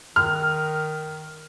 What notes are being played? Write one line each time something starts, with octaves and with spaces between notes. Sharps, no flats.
D#3 F6